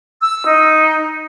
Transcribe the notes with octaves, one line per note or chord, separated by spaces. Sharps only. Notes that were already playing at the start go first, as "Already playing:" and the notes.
E6
D#4